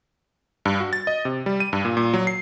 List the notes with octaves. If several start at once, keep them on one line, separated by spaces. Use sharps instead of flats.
G2
F#4
A6
D#5
C3
G3
D#7
G2
A#2
A#2
F#3
C7